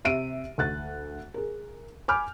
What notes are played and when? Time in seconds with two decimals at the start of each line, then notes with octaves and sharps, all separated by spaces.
0.05 C3 E5 D7 D#7
0.58 D2 F#6 A6
1.34 G#4 A#4
2.08 G#5 B5 D6 F6 G6